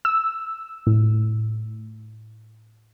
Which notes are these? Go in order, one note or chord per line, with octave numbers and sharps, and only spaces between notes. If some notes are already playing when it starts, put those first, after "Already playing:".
E6
A2